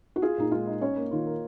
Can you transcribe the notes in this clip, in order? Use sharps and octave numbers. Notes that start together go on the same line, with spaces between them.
F#4
F4 G#4
A#2 D#4
G#3 F4
D#4
C#4 C#5
A#3
D#3 F4
A#4